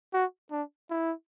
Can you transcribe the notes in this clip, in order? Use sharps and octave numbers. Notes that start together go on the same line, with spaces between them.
F#4
D4
E4